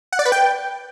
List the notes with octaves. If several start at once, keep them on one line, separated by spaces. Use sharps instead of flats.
F#5
D5
B4
G5